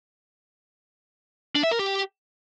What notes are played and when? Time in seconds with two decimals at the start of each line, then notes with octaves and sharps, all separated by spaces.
1.56 D4
1.63 E5
1.71 A#4
1.79 G4